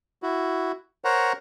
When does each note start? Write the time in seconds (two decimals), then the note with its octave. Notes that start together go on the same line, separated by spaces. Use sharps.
0.23 E4 F#4
1.04 A#4 C5 C#5 F#5 A#5